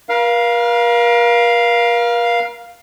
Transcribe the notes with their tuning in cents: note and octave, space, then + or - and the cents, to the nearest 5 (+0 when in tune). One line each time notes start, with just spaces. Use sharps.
A#4 +40 F5 +0